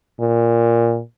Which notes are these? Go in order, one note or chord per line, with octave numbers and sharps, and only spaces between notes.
A#2